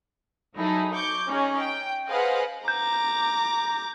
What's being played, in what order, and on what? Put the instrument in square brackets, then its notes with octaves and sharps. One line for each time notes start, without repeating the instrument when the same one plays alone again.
[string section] F#3 D#4 E4 G#4 A4
C#6 D6 G6
C#4 D#4 G#4
G5
G#4 B4 C5 D#5 F5 F#5
[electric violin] A#5 D6 [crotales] G6